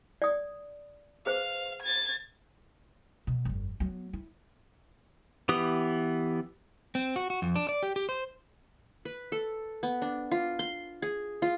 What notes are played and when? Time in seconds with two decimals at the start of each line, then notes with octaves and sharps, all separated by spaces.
0.22 D5 D#6
1.26 G#4 B4 C5 F5
1.82 G#6 A6
3.27 B2
3.45 G1 F2
3.80 F#3 B3
4.13 E4
5.49 E3 B3 G4 D#6
6.95 C4
7.16 F#4
7.30 F#4
7.42 F2
7.56 D4
7.69 D5
7.83 G4
7.96 G4
8.09 C5
9.05 B4
9.32 A4
9.83 B3
10.02 D4
10.31 F4
10.59 C6
11.02 G#4
11.42 F4